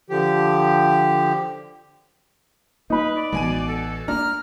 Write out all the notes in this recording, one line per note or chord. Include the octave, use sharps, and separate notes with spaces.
D3 F3 G4
A#3 D#4 B4 B5
D5
A1 B2 E3 G#3 G#5 D#7
A4
A#3 D4 D5 A#5 F6